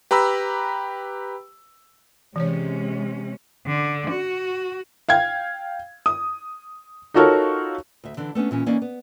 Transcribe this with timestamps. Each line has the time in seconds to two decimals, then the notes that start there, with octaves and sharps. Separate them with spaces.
0.11 G4 B4 A#5 B5 E6
2.36 C3 E3 G#3 C#4 C#5
3.66 D3
4.10 F#4
5.09 F5 G5 G#6
6.06 D#6
7.14 D#4 F4 F#4 A4 A#4 C#5
8.04 D2 E5
8.17 D3 E3 D4
8.35 A3 B3 C#4 D4
8.51 A#2 E3 C#4
8.66 E3 A#3 C#4 D#4 D5 F5
8.82 B3